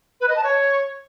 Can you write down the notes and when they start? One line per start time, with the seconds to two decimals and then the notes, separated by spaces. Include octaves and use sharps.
0.20 B4
0.28 D#5
0.36 A5
0.43 C#5